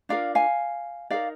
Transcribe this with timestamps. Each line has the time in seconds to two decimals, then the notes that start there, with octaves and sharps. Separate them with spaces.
0.09 D4 F4 A#4 D5 F5
0.35 F5 G#5
1.10 D#4 G4 A#4 D5 F5